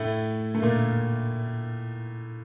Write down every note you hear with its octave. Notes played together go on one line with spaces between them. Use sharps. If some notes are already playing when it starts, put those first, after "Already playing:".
Already playing: A2 A3
A3
A#2 A#3